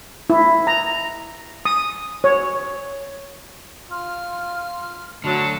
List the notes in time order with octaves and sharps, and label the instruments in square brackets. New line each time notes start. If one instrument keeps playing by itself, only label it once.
[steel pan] E4
A#5
D#6
C#5
[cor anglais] F4 [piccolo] F6
[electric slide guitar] D3 [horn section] F#3 [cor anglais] A3 [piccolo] A5